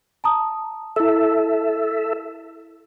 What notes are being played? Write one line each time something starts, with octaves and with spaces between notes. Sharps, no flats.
A5 A#5 D#6
E4 A4 E5 E6